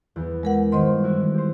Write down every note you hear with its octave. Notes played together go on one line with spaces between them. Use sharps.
E2 B3
G#3 A#4 F#5
G2 D#3 C5 D#5 C6
E3 E4 F#4
G4 C5